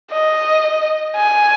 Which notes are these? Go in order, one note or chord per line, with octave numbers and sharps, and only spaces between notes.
D#5
G#5